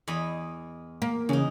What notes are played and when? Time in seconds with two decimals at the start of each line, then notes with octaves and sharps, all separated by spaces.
0.08 E2 D#5 B5
1.02 A#3
1.29 E2 C#3 D#4